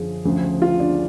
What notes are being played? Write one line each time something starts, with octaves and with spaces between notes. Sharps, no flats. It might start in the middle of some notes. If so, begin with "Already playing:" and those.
Already playing: F#2 D3 F3 G#4
D2 C#3 F3
F4
D4